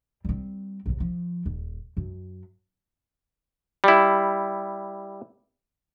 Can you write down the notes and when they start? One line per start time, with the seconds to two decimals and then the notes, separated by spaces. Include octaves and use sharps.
0.24 G3 C4
0.86 A#1 D#2
1.00 F3
1.46 D#1
1.97 F#2
3.84 G3 E4